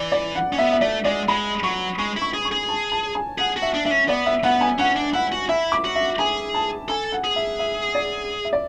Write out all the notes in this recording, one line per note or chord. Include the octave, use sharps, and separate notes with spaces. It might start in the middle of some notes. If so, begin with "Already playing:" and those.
Already playing: E3 D5
D5
F#5
C#4
B3 E5
E5
A3 D5
G#3 D5
G#3 B5
F#3 C#6
G#3 C#6
E4 C#6
G#4
C#6
G#4
A5
A5
G#5
G#4 F#5
F#4
E5
D4
D4 E5
C#4
B3 D5
E5
B3 F#5
G#5
C#4 F#5
D4
E4 F#5
F#4
E4 E5
D6
F#4
E5
G#4 G#5
A5
A4 G#5
F#5
G#4
E5
E5
D5
E5
D5